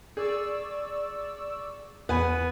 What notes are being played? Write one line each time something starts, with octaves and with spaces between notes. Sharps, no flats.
G#4 D5 C#6 E6
E2 B3 F#5 G#5 B5